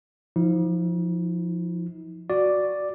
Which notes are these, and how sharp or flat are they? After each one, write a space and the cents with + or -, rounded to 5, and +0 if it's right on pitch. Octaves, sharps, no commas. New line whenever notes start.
F3 +0 D#4 +45
F#4 +0 D5 +0